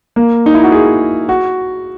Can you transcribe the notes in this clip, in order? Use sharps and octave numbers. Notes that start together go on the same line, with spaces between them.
A#3
D#4
E4
F#4
G#4
F#4